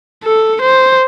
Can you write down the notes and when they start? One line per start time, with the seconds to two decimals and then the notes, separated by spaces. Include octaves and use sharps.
0.23 A4
0.61 C5